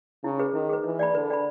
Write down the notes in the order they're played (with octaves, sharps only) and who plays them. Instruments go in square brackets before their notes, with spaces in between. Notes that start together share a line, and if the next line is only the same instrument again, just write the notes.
[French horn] C#3 [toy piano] E4
[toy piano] G#4 B4
[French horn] D#3 [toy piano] E4
[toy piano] G#4 B4
[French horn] E3 [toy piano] B4
[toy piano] D5 G5 B5
[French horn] D3 [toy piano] B4
[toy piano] D5 G5 B5